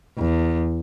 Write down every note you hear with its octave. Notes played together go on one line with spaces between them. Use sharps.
E2